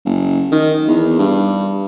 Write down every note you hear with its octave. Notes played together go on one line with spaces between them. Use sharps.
F#1
D#3
E2
G2